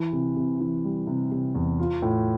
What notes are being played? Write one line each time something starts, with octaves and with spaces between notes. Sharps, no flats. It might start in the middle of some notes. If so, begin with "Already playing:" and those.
Already playing: E3
C3
C3
E3
G3
C3
C3
E2
F4
A2